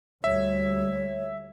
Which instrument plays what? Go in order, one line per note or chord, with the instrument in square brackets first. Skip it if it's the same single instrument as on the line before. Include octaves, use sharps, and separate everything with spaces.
[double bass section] D2 G3 A3 [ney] C#5 [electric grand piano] E5